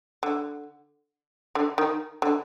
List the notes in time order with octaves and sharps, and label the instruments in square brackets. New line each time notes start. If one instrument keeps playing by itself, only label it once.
[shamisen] D3
D3
D#3
D3